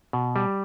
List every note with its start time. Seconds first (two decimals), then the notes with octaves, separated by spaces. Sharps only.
0.13 B2
0.36 G3